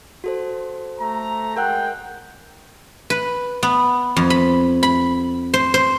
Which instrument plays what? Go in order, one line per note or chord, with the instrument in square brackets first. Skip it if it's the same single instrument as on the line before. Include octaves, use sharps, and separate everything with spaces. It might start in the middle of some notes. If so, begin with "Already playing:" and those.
[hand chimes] F#4 A4 C5
[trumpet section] A3 A#5
[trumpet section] G#3 G5 [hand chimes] A#4 F#5 F#6
[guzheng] B4
B3
F2
B5
B5
C5
C5